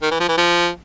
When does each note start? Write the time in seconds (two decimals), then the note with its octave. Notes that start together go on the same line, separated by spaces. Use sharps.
0.02 D#3
0.11 E3
0.20 F3
0.29 E3
0.37 F3